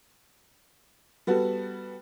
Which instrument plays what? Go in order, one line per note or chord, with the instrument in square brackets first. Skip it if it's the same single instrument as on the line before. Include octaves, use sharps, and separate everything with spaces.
[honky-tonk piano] G3 B3 F#4 A4